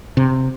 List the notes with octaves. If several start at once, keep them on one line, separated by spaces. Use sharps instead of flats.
C3